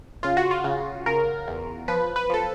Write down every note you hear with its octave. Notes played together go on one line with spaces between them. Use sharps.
C#3 F4
F#4
F4
C#3
C#3 A#4
E2
F3 B4
B4
F3 A4